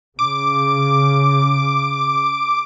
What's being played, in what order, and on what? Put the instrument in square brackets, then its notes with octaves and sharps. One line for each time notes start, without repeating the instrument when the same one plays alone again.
[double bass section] C#3 [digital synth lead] D6